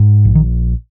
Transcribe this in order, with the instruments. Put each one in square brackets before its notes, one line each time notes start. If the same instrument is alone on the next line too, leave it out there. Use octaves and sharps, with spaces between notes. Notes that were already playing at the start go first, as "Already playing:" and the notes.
Already playing: [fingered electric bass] G#2
A#1
D#3